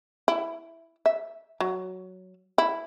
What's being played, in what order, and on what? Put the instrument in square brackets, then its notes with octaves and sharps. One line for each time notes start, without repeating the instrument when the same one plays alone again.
[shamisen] E4
E5
F#3
E4